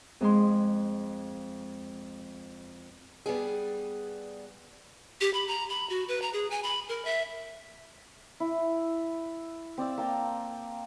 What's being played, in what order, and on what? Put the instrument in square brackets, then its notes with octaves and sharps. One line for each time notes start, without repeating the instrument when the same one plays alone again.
[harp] F2 G#3 C6
[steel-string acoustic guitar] G3 B3 D4 G#4
[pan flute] G4
B5
A#5
B5
F#4
B4
A#5
G#4
G#5
B5
A#4
E5
[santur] E4
C4 D5 F5 E6
A#3 G5 A5 A#5